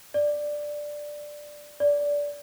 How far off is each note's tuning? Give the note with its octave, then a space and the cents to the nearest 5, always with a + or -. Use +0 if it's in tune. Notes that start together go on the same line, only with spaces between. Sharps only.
D5 +5
D5 -15